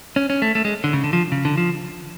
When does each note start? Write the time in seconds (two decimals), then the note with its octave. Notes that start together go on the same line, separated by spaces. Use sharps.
0.16 C#4
0.30 C#4
0.42 A3
0.55 A3
0.65 G#3
0.84 D3
0.93 C#3
1.04 D3
1.13 F3
1.32 C#3
1.45 D3
1.57 F3